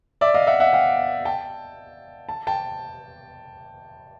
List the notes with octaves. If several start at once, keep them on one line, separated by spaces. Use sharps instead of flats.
D5 E5
D#5 F5
E5 F#5
E5 F#5
F5 G5
G5 A5
A5
G5 A5